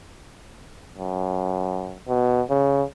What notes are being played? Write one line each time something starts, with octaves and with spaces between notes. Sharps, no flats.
F#2
B2
C#3